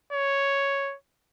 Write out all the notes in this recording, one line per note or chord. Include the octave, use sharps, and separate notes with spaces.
C#5